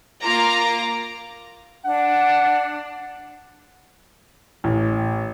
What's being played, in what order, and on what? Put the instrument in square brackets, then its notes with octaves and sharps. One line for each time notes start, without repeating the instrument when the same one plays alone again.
[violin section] A#3 F4 A#5 D6
[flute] D4 [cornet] F#5
[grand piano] A1